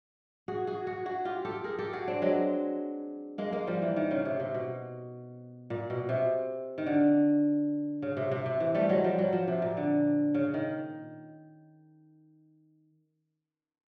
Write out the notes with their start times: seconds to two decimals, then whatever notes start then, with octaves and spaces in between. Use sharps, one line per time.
0.48 F#4 G#4
0.67 F#4 G#4
0.87 F#4 G#4
1.06 F#4 G#4
1.25 F4 G4
1.45 G4 A4
1.64 G#4 A#4
1.79 G4 A4
1.93 F#4 G#4
2.08 C4 D4
2.22 F#3 G#3
3.38 G#3 A#3
3.53 G#3 A#3
3.67 F3 G3
3.82 E3
3.96 D#3
4.11 C#3
4.25 C3
4.40 C3
4.55 B2
5.70 A#2
5.90 B2
6.09 C3
6.78 D#3
6.87 D3
8.02 C#3
8.17 C3
8.32 C3
8.46 C3
8.60 E3
8.75 G3 A3
8.89 F#3 G#3
9.04 F3 G3
9.18 F#3
9.33 F3
9.48 C3
9.62 A#2
9.77 D3
10.35 C#3
10.54 D#3